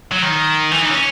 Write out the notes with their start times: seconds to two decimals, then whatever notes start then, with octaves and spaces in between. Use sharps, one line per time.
0.12 F#3
0.22 D#3
0.71 E3
0.82 D#4
0.90 C#4